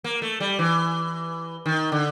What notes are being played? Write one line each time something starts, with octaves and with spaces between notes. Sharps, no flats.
A#3
A3
G3
E3
D#3
D3